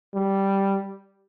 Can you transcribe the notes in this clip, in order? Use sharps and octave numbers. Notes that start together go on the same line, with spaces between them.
G3